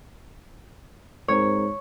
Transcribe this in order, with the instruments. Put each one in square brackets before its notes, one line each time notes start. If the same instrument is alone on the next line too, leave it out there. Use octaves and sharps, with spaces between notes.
[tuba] G#2 [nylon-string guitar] C4 A#4 [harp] C#5